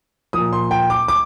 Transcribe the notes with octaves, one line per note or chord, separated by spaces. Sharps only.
A#2 F3 D#6
C6
G5
D6
D6